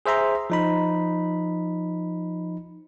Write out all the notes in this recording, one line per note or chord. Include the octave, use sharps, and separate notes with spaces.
G#4 C5 E5 A#5 C6
F3 D#4 B5